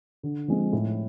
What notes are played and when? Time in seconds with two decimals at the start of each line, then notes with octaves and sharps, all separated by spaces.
0.23 D3
0.48 F3 G#3 C4
0.73 A2